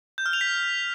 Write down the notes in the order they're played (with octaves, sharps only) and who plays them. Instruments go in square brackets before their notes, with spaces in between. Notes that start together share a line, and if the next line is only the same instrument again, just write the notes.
[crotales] G6
F6
F7
B6